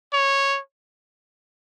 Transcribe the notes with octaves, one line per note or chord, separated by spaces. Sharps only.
C#5